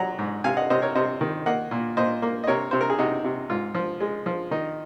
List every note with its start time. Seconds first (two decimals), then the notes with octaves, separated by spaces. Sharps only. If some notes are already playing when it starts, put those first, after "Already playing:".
Already playing: F#3 F#5 A#5
0.19 G#2
0.44 C3 F5 G#5
0.57 D#5 F#5
0.70 C3 C5 D#5
0.82 A#4 C#5
0.95 C3 C5 D#5
1.21 D#3
1.46 A#3 D#5 F#5
1.71 A#2
1.97 A#2 C5 D#5
2.22 A#3
2.44 D#5
2.47 C3 A#4 C#5
2.71 C3 C5
2.81 A#4
2.90 G#4
2.98 C3 D#4 F#4
3.24 C3
3.50 G#2 F4
3.75 F3
4.00 G#3
4.26 F3
4.51 D#3 D#4